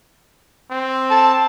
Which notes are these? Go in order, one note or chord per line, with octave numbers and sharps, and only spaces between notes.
C4
A4 A5